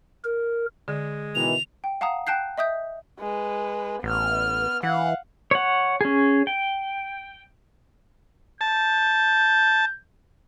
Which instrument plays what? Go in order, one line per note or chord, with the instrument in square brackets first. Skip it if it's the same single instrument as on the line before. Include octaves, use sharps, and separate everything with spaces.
[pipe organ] A#4
[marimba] D3 [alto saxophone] G#3
[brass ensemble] B2 D#3 E3 [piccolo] F7
[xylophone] G5
F5 F#5 A5 A#5 D#6
G5 A5 F#6 G6 C7
D#5 E5 D#6 G6
[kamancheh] G#3 B4
[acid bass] A1 [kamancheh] B3 F6
[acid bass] E3 [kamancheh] F5 F#5
[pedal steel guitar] C#5 F#5
C#4 G#4
G5
[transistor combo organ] A5 [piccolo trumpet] G6